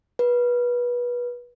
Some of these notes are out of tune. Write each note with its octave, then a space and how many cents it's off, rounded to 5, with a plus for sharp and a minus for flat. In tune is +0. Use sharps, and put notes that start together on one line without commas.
B4 -25